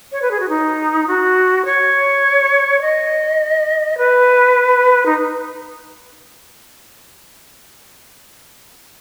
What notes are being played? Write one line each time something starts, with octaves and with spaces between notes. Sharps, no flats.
C#5
B4
G#4
F#4
D#4
F#4
C#5
D#5
B4
D#4